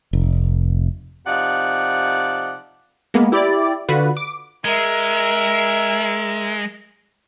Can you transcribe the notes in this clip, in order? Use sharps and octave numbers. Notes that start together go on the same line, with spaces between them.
F1
C3 F3 D#4 D5 F#5
G#3 A#3 B3
E4 G4 D5
D3 F4 F#4 B4
D6
G#3 A#4 E5